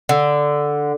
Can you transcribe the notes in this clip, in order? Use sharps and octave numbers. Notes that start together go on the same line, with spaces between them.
D3